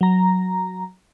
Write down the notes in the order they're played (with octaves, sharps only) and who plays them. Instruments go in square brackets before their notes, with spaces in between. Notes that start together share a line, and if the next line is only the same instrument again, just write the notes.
[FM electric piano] F#3 A#5